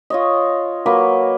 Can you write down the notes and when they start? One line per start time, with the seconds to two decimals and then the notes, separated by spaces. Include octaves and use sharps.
0.10 F4 C#5 D#5
0.86 F#3 A#3 B4